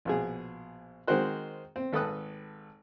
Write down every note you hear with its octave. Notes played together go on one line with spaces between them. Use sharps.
A#1 B2 G#4
D#3 G#3 C4 F#4 C5 F#6
C4
G#1 A4 B4 D#6 F#6